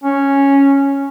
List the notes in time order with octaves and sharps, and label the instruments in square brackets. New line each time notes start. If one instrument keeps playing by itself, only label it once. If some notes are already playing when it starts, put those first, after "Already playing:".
[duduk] C#4